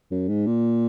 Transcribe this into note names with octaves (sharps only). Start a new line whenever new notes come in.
F#2
G#2
A#2